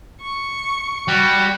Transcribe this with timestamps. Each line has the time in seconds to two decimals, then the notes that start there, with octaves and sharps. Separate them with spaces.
0.21 C#6
1.08 G3 F#4